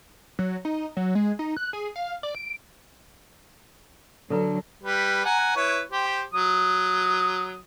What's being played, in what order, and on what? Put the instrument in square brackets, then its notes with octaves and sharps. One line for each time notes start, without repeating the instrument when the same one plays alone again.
[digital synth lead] F#3
D#4
F#3
G#3
D#4
F#6
G#4
F5
D5
D7
[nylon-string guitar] D3 D4 [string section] F#3 [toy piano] A4 B4 A#5
[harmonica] G3 B4
F#5 G#5 A#5
E4 B4 C#5
G4 C5
F#3 D#6